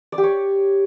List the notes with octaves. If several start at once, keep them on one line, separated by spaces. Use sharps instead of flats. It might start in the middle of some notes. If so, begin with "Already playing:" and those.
D5
G4
C#5